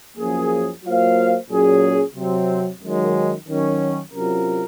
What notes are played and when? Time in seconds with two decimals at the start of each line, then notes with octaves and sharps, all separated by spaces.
0.18 F#2 F3 A#3 C#4 G#4
0.84 F#3 A#3 F4 C5 F5
1.49 A#2 F#3 C#4 G#4 C#5
2.16 C3 F#3 C4
2.81 F#2 D#3 G#3
3.47 D#3 F#3 C#4
4.13 C3 F#3 C#4 F4 A#4